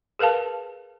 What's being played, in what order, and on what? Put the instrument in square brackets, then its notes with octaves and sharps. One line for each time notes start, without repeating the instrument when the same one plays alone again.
[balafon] G#4 A#4 B4 F5 A5